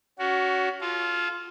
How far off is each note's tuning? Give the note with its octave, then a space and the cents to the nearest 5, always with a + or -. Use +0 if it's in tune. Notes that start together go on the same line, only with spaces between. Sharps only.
C#4 +30 F#4 +10
F4 +0 A4 -35